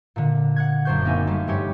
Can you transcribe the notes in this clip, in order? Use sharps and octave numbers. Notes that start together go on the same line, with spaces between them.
A#2 D3
F#5 F#6 G#6
F#1 F#2 D4 C5 C#6 G6
A#3 C4 D#4 A4 E5 G#5
G3 A3 A4 C5
F1 G2 C#4 G4 C#5